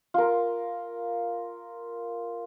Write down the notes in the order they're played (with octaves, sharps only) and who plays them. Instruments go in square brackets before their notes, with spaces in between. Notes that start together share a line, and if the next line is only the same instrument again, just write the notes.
[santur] F4 A#4